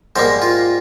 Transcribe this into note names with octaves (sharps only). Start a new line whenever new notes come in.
G#2 G3 A#3 C5
F4